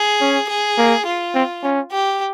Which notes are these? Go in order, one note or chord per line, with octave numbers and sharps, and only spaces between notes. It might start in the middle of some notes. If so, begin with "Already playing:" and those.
Already playing: G#4
C#4
G#4
A#3
F4
C4
C#4
G4